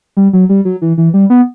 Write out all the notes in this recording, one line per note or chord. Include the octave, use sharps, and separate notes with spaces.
G3
F#3
G3
F#3
E3
E3
G3
B3